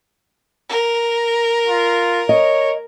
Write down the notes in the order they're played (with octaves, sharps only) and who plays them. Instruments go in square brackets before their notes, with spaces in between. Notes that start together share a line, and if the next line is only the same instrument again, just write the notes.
[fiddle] A#4
[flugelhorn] F4
[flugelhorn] C#5 [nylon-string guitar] D#5